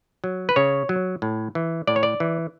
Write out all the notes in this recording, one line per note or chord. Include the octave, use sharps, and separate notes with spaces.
F#3
B4
C#3 C#5
F#3
A2
E3
A2 D5
C#5
D5
E3